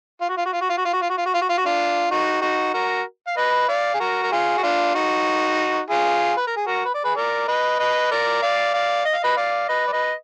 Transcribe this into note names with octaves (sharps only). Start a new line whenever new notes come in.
F4
F#4
F4
F#4
F4
F#4
F4
F#4
F4
F#4
F4
F#4
F4
F#4
F4
F#4
F4
F#4
D4 F4
D#4 F#4
D#4 F#4
F#4 A#4
F5
B4 D#5
D5 F5
G#4
F#4 A#4
A#4
F4 G#4
F#4
D4 F4
D#4 F#4
F4 G#4
B4
A#4
G#4
F#4 A#4
B4
D5
G#4 B4
A#4 D5
B4 D#5
B4 D#5
A#4 D5
D5 F5
D5 F5
D#5
F5
B4 D#5
D5 F5
B4 D#5
D5
B4 D#5